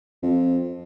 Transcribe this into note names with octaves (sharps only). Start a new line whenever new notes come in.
F2